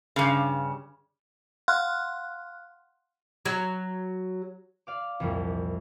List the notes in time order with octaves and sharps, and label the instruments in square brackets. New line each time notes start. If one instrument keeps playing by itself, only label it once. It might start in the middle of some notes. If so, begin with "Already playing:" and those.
[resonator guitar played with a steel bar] G2 C#3
[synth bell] F5 F#5 C6 F6 F#6
[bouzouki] F#3
[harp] D5 F5 D6
C2 F2 A#2 E3 G3